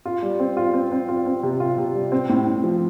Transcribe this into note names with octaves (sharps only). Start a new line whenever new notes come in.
F4
G3
C4
F4
C4
C4
F4
C4
C3
F4
C3
G3
C4
A2
A2
F3